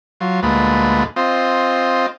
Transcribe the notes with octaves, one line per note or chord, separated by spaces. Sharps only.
F#3 F4
D2 A#2 G#3 B4
C4 F4 D#5